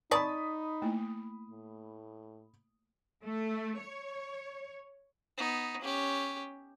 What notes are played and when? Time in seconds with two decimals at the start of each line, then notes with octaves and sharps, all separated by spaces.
0.11 D#4 C#5 D5 A5 B5 D#6
0.82 A3 A#3 E4
1.50 A2
3.23 A3
3.80 C#5
5.37 B3 D#4
5.81 C#4 G4